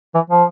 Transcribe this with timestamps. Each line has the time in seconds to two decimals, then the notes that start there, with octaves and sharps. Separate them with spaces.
0.14 E3
0.30 F3